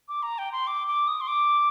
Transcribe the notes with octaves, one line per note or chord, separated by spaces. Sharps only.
D6
A#5
G5
C6
D6
D6
D#6
C6
D6